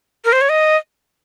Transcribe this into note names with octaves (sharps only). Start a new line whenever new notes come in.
A#4
C5
C#5
D#5